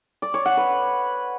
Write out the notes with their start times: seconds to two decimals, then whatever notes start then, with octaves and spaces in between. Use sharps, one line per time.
0.22 D5
0.34 C#5
0.46 F#5
0.57 B4